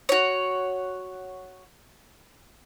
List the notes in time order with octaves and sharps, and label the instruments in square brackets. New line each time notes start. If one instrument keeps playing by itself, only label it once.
[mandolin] F#4 C#5